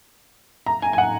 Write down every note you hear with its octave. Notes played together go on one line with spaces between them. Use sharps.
A#5
G#5
G#5
F#5